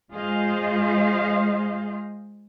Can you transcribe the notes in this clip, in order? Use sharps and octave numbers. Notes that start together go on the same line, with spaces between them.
G#3 F4 G#4 C5 D#5 F5